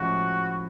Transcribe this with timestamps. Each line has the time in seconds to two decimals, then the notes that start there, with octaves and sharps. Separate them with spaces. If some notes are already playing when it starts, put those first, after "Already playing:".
Already playing: A2 F3 G#3 C#4 F#4